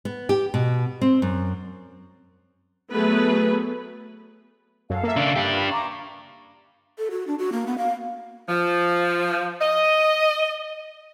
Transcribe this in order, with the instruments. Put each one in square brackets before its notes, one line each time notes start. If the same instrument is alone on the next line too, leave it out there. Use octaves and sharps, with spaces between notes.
[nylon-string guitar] B3
G4
B2
C4
F#2
[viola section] F#3 A3 B3 G#4 B4
[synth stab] F#2 [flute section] A4 F5
[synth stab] A#3 E5
[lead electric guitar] C#3 D4
D4 G4
[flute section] F4 B4 B5
A#5 C#6 D6
[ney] A4
F#4
D4
F#4
A#3
B3
F5
[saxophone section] F3
D#5